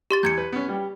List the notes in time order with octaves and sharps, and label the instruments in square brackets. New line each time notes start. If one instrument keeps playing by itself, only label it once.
[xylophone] G4 C6 A6
[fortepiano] E2 [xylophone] G6 G#6 C#7
[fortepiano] B4
B3 C#4
G3 G4